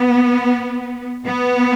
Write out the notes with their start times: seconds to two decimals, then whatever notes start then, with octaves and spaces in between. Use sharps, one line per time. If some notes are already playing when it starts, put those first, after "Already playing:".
Already playing: B3
1.25 B3